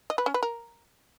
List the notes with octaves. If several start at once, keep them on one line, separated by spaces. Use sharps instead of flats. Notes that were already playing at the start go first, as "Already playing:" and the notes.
D#5
B4
C#4
B4
A#4